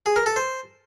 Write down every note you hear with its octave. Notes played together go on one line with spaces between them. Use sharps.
G#4
A#4
A4
C5